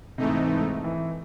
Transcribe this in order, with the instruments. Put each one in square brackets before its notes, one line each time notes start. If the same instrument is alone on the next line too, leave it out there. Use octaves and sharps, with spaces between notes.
[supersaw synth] G#2 E3 A3 D#4 [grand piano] C3
[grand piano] E3